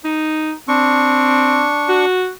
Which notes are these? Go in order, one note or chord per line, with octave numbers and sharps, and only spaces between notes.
D#4
C4 D4 C#6
F#4